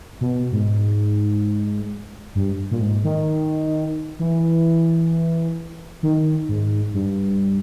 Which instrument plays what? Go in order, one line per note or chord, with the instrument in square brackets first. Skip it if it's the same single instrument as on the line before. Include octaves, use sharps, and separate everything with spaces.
[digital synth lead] B2
G#2
G2
A#2
G#2
D#3
E3
D#3
G#2
G2